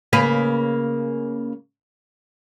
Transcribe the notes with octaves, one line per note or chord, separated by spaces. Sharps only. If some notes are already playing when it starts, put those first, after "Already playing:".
C#3 A#3 B4